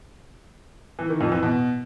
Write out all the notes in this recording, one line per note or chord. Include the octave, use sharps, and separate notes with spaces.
E3
D#3
F2
E3
B2